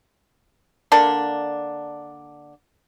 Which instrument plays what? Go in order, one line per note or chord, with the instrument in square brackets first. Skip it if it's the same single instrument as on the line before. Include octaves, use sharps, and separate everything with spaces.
[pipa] D3 A#3 D4 A5